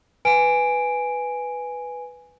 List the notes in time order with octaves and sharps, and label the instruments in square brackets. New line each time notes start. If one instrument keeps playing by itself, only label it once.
[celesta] B4 G#5 D7